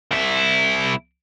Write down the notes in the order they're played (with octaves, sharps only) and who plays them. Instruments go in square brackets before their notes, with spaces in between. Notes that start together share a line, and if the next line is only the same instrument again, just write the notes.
[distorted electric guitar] C2 E4